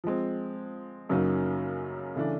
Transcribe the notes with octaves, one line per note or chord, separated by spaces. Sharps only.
F3 G#3 C4
F#2 C#3 F#3 A#3 D#4
C#3 E3 A3 D4